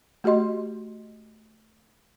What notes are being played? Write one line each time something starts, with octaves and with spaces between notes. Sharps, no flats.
A3 F#4 G4 D#5 C6